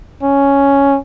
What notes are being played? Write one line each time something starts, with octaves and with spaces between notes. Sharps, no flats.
C#4